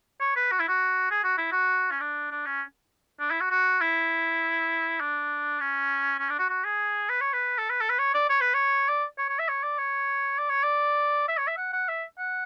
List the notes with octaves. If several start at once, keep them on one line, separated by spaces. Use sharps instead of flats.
C#5
B4
F#4
E4
F#4
G#4
F#4
E4
F#4
C#4
D4
D4
C#4
D4
E4
F#4
F#4
E4
D4
C#4
C#4
D4
F#4
F#4
G#4
B4
C#5
B4
A4
B4
A4
B4
C#5
D5
C#5
B4
C#5
D5
C#5
C#5
E5
C#5
D5
C#5
D5
C#5
D5
E5
C#5
E5
F#5
F#5
E5
F#5